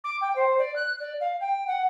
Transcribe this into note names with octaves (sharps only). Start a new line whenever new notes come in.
D6
G5
C5
D5
F#6
D5
F5
G5
F#5